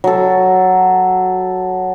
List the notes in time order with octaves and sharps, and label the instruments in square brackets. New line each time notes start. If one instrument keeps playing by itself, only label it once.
[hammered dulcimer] F#3 A4